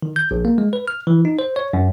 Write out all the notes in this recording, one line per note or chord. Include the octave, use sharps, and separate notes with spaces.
D#3
G6
A#1
A#3
G#3
B4
F6
E3
D#4
C5
C#5
F#2